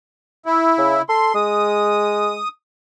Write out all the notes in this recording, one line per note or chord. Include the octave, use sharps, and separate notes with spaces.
E4
C#3
A4 C6
G#3 D#6